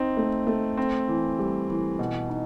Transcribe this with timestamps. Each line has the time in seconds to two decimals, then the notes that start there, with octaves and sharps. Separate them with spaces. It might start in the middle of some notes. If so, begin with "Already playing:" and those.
Already playing: C4 D#4
0.17 A3
0.47 A3
0.77 C4
1.08 E3
1.39 G3
1.69 E3
1.99 B2
2.29 D#4